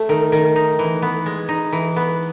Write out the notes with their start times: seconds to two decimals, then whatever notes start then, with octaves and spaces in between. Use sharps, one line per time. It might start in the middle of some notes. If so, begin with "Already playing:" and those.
Already playing: A3
0.09 D#3
0.32 D#3
0.56 D#4
0.79 E3
1.02 B3
1.26 G#3
1.49 D#4
1.73 E3
1.96 B3